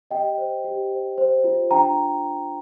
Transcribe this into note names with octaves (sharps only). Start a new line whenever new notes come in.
G4 D#5 G5
C5
G4
C5
C5
F4
D4 G5 A#5